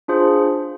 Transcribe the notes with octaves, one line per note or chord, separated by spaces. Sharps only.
D4 F4 G#4 C5